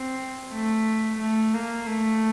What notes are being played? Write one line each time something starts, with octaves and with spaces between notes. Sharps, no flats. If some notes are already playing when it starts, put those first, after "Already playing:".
Already playing: C4
A3
A3
A#3
A3